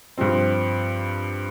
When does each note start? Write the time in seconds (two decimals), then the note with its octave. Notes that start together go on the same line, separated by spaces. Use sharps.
0.18 G2 F3 C4